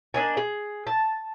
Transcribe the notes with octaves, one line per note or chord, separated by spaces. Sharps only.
A#3 D4 D#5 G#5
G#4
A5